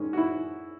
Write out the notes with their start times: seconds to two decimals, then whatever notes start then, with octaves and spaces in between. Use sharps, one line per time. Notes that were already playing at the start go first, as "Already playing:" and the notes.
Already playing: D#3 G#3 C#4
0.13 F#4
0.17 E4